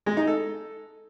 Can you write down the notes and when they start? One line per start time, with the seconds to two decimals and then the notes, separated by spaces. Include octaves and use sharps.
0.06 G#3
0.17 D#4
0.27 A4